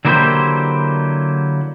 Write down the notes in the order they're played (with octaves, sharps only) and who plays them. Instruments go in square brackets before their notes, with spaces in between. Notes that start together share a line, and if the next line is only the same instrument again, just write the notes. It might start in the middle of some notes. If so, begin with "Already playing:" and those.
[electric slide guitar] D3 F#3 A#3 E4 G4 C5